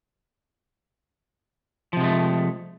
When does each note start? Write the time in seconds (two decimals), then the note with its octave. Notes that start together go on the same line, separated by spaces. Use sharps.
1.93 F3
1.97 C3
2.00 G#3
2.04 A3